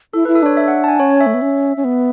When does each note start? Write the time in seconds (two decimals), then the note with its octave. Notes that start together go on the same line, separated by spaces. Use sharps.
0.13 E4 A4
0.25 E4 B4
0.35 A4
0.43 D4 C#5
0.57 E5
0.68 F#5
0.84 A5
0.88 G#5
0.99 C#4 C#5
1.20 E5
1.26 A3
1.34 B3
1.42 C#4
1.77 C#4
1.84 B3